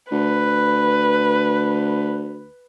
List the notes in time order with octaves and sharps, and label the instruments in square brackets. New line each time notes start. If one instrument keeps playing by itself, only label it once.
[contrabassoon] D2 [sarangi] B4